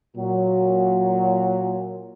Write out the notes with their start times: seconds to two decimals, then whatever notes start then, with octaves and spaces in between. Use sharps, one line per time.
0.16 A#2 F#3